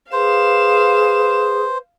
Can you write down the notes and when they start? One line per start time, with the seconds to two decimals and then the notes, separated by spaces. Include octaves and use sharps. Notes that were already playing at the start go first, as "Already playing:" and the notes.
0.12 G#4 B4 C5 F5 E7